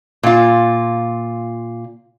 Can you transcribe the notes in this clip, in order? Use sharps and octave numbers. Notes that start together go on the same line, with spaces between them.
A#2 F4